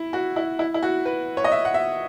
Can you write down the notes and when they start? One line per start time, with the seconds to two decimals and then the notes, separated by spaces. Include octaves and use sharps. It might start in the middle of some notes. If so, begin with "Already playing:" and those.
Already playing: E4
0.13 F#4
0.36 E4
0.59 E4
0.74 E4
0.83 F#4
1.05 B4
1.37 C#5
1.44 D#5
1.52 E5
1.65 F#5
1.74 E5